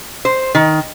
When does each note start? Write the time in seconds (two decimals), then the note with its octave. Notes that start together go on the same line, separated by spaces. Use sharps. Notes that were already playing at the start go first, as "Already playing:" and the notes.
0.25 C5
0.55 D#3